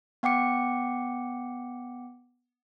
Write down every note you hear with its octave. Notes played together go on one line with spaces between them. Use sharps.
B3 F#5 G5 D6 C#7